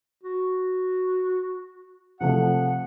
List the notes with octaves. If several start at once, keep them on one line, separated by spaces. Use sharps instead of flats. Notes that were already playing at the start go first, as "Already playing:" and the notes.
F#4
C3 F3 A3 F#5